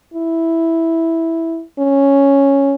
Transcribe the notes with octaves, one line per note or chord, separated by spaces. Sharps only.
E4
C#4